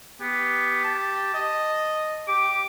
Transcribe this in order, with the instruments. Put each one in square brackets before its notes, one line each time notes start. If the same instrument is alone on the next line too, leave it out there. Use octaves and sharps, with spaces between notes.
[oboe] B3 [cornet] G4
[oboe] A5
[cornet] D#5
[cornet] G4 [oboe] D6